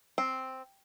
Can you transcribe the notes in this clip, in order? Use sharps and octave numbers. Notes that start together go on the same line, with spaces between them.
C4